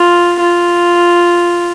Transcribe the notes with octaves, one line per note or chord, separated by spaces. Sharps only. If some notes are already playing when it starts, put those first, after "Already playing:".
Already playing: F4
F4